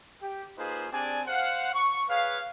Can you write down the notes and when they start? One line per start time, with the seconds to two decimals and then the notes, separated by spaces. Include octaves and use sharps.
0.22 G4
0.58 A#3 D#4 F4 G#4 B4 C5
0.92 C4 D4 G4 G#4 D5 G#5
1.28 C5 F5 F#5
1.74 C#6
2.09 G#4 B4 C#5 F5